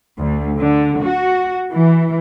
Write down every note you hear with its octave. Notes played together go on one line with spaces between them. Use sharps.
D2
D3
F#4
E3